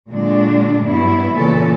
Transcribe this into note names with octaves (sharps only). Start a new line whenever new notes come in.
A#2 D3 F#3 G#3 D4
G2 B2 F#3 B3 E4
A#2 C#3 E3 C#4 A4